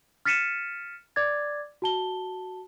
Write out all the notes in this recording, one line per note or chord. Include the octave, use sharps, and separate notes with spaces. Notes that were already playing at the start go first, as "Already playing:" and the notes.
F6 A6 B6 C#7 D#7 E7
D5 D6 G#6 A6
F#4 A5 G7